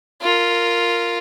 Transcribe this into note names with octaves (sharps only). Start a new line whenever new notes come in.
F4 A#4